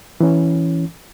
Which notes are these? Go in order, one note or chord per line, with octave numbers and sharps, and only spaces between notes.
E3 C#4